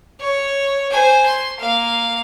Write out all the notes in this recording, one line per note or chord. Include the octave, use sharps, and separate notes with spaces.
C#5
C5 G#5
C6
A#3 F5